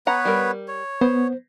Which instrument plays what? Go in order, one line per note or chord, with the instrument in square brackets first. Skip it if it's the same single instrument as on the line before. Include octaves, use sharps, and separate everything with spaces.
[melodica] B3 B4 C#5 [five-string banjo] F#5 A#5
[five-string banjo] G3 A#4
[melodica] C#5
[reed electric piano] B3 [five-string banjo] C5